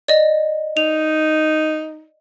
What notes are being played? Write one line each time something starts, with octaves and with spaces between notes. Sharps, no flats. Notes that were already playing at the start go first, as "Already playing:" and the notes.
D5 D#5
D#4 F7